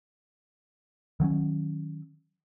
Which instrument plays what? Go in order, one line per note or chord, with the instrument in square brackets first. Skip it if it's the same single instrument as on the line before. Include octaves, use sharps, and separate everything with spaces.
[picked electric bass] D#3 F#3 C4 C#4